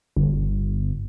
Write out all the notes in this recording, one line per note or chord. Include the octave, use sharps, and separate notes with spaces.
G1